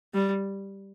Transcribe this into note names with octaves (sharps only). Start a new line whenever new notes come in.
G3